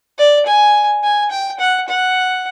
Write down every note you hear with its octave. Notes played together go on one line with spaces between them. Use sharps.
D5
G#5
G#5
G5
F#5
F#5